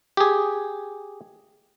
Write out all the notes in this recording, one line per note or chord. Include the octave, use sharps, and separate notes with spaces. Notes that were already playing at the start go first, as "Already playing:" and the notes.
G4 G#4